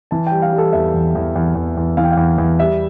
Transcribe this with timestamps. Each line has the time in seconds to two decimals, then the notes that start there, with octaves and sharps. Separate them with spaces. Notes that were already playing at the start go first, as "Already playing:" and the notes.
0.11 E3 A5
0.27 G3 G5
0.42 F5
0.53 G3
0.58 A4
0.73 E2 E5
0.94 E2
1.15 E2
1.35 E2
1.55 E2
1.77 E2
1.97 E3 F5
2.04 G5
2.12 E2 F5
2.38 E2
2.60 G3 E5